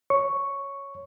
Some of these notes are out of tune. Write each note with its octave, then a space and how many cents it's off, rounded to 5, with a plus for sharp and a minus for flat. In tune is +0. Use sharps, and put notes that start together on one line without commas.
C#5 +0 C#6 +0